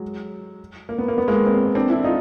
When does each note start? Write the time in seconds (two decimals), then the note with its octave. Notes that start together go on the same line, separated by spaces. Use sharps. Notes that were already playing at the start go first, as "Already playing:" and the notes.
Already playing: F#3 G#3
0.89 A#3
0.98 B3
1.08 A#3
1.18 B3
1.28 G#3 A#3
1.46 A#3 C4
1.75 C4 D4
1.89 D4 E4
2.04 D#4 F4